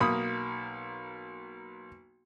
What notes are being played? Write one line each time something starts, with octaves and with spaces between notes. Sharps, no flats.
B1 A#3 B5 D#6